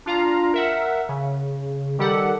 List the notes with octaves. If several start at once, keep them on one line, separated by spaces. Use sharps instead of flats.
D4 F4 F5 A#5
A#4 E5 F#5
C#3
D#3 G3 G4 A4 F#5